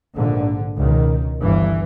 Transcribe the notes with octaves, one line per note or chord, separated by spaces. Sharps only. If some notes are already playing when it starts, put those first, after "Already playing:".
A#1 G#2 D3
C#2 B2 D#3
G1 G2 E3